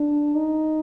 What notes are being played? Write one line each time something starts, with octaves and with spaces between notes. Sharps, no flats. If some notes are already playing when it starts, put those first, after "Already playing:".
Already playing: D4
D#4